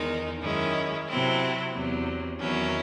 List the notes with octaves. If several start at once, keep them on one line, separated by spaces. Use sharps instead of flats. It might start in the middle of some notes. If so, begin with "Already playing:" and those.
Already playing: E2 D#3 G#3 D#4
F#2 D#3 G#3 C#4 E4
C3 F#3 C4 E4
E2 C3 F#3
E2 D#3 F#3 C#4 E4